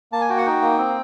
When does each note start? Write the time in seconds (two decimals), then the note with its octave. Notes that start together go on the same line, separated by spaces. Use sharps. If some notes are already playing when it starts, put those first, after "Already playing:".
0.12 A#3 A5
0.21 G#5
0.29 F#4 G5
0.38 F#5
0.46 D#4 G5
0.62 A#3
0.78 C4